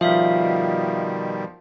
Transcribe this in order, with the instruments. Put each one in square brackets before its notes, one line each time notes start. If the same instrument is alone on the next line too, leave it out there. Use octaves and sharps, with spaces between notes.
[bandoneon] B2 D#3 G3 [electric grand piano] F3 [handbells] E5 F5